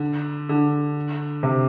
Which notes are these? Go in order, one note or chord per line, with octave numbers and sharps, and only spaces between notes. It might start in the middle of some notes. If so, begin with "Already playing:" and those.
Already playing: D3
D3
C3